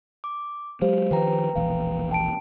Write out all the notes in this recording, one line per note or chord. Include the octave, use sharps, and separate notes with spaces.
D6
F#3 G#3 G4 C5 F5
D#3 F3 B4 G5 A#5
E1 A#1 E3 F5
G5 A5 D7